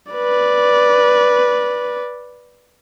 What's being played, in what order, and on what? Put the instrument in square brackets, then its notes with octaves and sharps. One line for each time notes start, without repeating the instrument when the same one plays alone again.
[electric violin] B4 D5